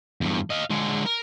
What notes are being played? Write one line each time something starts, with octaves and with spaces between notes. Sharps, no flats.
E2 G2
D#5 F5
D3 G#3
A#4